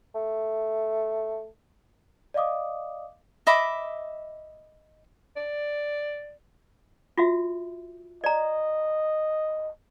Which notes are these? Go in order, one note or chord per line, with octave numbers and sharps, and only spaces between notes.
A3
D5 D#5 F5 D6 D#6
D#5 E5 B5 D6
D5
F4 F#4 E5
D5 D#5 A#5